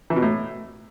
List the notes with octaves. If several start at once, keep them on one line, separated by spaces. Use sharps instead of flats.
E3
B2
A2